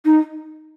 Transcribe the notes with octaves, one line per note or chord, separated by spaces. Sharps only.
D#4